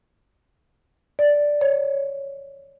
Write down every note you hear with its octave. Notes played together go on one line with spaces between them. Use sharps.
D5
C#5